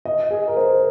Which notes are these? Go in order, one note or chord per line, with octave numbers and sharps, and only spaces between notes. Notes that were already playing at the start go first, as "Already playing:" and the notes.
D#5
G#4
A#4
C5